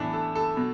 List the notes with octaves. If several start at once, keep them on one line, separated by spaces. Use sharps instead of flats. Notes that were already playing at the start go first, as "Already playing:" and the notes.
Already playing: A2 E3 B3 D4 E4
A4
A4
B2